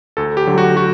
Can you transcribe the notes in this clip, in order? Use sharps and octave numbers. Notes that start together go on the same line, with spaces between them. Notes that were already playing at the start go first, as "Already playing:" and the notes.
D2 A4
G4
D3 F#3
F#4
F#4